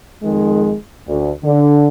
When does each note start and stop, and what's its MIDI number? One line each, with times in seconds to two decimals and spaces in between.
0.23 0.75 41
0.23 0.75 51
0.23 0.75 56
1.08 1.31 38
1.44 1.88 50